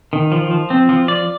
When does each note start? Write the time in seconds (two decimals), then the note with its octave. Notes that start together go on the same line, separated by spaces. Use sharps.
0.13 D#3
0.32 F3
0.51 F3
0.70 C4
0.89 F3
1.08 D5